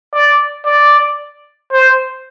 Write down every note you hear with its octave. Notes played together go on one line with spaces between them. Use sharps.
D5
D5
C5